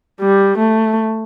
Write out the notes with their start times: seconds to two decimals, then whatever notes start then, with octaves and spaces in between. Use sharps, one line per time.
0.21 G3
0.59 A3